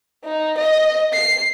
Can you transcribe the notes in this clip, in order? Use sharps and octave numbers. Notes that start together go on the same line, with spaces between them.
D#4
D#5
C7